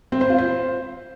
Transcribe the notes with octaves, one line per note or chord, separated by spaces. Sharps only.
C4
C5
F4
C5